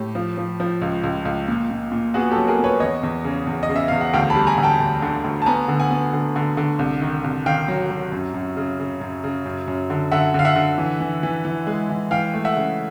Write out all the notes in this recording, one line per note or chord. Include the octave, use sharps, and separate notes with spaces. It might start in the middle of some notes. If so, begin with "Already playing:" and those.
Already playing: A2 G4
F3
F3
F3
C#2
C#2
C#2
A#2
A#2
A#2
B3 F#4 G#4
G4 A4
F#3
G#4 A#4
B3
B4 C#5
E2 C#5 D#5
E2
C#3
E2
D#5
C#3
E5
E2 F5
F#5
D2 F5 G5
A5 B5
G3
G#5 A#5
D2
G5 A5
D2
D3
D2
A5
B3 G#5 A#5
D3
F#5 G#5
B3
D3
D3
D3
C2
D#3
C2
D#3 F5 G5
F#3
F#3
F#2
F#2
C#3
C#3
F#2
C#3
F#2
F#2
D3
D3 E5 F#5
D3 F5
E5 F#5
D3
E3
E3
E3
E3
G#3
E3
E3 F5 G5
A3
E5 F#5
C#3